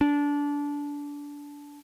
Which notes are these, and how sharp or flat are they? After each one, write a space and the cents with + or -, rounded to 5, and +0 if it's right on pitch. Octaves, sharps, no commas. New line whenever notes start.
D4 -20